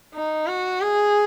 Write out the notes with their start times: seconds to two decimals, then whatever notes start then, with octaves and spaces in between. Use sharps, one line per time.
0.14 D#4
0.46 F#4
0.81 G#4